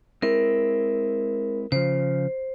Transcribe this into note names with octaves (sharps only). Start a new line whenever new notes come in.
G#3 C4 E4 A#4
C#3 F3 C5